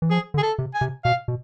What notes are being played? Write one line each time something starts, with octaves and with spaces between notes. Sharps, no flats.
E3
F3 G#4
D3
G#4
A4
C3
G#5
C3
B2 F5
B2